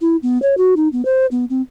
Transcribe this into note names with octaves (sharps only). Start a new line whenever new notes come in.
E4
B3
C#5
F#4
D#4
B3
C5
B3
C4